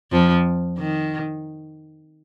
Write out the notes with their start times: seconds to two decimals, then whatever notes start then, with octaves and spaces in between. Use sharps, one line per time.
0.12 F2 F3
0.78 D#3